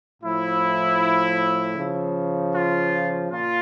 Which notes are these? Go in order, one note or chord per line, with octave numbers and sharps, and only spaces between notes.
A2 F3 E4
C#3 F3
F4
A#2 F4